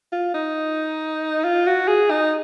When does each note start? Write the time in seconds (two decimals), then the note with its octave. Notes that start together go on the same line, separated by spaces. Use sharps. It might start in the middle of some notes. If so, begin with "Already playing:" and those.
0.12 F4
0.34 D#4
1.44 F4
1.67 F#4
1.88 G#4
2.10 D#4